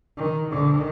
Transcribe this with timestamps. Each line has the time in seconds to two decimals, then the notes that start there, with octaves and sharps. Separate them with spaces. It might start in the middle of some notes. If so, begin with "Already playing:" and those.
0.18 D#3
0.50 D#3